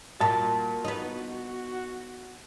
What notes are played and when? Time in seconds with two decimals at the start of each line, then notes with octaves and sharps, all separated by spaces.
0.21 A#2 F#4 A5
0.84 B3 D#4